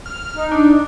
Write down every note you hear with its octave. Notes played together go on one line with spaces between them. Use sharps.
F6
D#4
D4